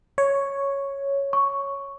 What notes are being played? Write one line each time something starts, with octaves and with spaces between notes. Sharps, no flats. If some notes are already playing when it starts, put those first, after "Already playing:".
C#5
C#6